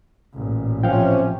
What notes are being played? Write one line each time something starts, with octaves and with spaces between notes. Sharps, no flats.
A1 A#2
C3 F3 C#4 F5 G5